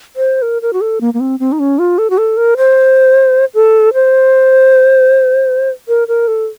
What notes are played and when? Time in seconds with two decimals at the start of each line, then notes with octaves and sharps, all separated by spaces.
0.16 C5
0.42 A#4
0.62 A#4
0.73 F#4
0.81 A4
1.01 A#3
1.14 A#3
1.20 C4
1.40 C4
1.52 D#4
1.59 C#4
1.79 F4
1.98 A4
2.10 F#4
2.18 A4
2.37 A#4
2.57 C5
3.54 A4
3.94 C5
5.88 A#4
6.08 A#4
6.28 A4